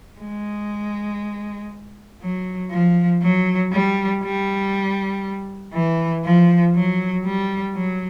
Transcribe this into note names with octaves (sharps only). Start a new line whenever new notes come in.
G#3
F#3
F3
F#3
G3
G3
E3
F3
F#3
G3
F#3